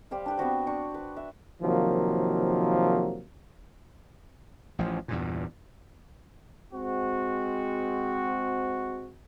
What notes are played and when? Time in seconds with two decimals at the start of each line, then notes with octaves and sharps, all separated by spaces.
0.11 G3 G4 C5 F5
0.26 D4 G4 B4
0.37 B3 C4 F#4 C5
0.67 D4 C5 C#6
0.94 B4
1.16 E5
1.62 C3 D#3 F3 F#3 A#3
4.79 A1 F3
5.08 E2 G2 A#2
6.73 G#3 C4 F#4